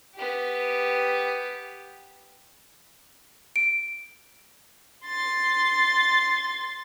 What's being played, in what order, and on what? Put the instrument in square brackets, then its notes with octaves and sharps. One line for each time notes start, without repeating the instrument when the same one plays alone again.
[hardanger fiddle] B3 G4
[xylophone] D7
[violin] C6 A6